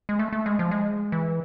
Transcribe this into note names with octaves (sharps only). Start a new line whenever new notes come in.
G#3
A3
A3
G#3
F3
G#3
E3